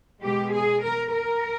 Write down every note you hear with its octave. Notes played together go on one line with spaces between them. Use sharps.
B2 G#3 G4
G#4
A#4
A#4